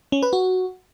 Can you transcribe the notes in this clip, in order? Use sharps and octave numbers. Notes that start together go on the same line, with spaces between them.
C#4
B4
F#4